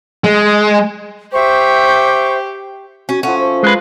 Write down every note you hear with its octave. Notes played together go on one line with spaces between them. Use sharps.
G#3
G4 C5 E5 C#6
C#4 F#4
F3 A3 C#4 F#5
C5
G#3 F4 B4